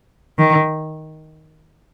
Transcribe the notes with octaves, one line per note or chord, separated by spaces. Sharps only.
D#3